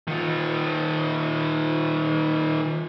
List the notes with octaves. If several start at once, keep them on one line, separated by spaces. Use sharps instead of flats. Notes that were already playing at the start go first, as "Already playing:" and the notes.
D#3 F4